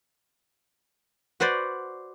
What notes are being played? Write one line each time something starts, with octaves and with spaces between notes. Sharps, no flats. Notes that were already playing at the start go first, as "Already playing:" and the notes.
F#4 B4 C5 D5